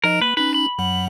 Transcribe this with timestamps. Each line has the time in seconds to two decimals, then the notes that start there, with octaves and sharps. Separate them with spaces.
0.04 F3 D#4 A#4 D#5
0.22 A#3 B4
0.37 C#4 D#4 B4
0.54 B5
0.79 F#2 F#3 F#5